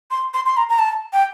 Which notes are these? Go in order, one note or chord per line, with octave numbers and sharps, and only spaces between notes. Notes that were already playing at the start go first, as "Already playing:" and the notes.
C6
C6
C6
A#5
A#5
A5
G5